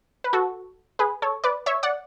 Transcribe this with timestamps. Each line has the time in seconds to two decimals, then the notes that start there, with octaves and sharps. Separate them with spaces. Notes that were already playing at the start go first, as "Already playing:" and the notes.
0.24 B4
0.33 F#4 A4
0.99 G#4 B4
1.22 A4 C#5
1.44 B4 D5
1.66 C#5 E5
1.83 D5 F#5